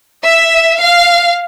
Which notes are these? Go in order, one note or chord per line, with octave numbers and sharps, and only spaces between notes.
E5
F5